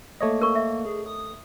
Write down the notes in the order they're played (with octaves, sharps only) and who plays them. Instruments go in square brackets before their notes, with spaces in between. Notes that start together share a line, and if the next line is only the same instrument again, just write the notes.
[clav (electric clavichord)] A3 C#5 D#5 [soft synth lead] A#3
[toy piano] A#4 C#6
E5
[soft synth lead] G#4
D#6